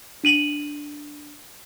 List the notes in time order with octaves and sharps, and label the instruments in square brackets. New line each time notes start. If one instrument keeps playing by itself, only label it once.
[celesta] D4 D#7 F#7